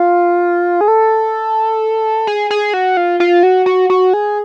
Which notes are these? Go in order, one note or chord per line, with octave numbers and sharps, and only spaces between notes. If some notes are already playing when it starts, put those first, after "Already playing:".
Already playing: F4
G#4
A4
G#4
G#4
F#4
F4
F4
F#4
F#4
F#4
G#4